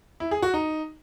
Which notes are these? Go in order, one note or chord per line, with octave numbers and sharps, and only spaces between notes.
E4
G#4
F#4
D#4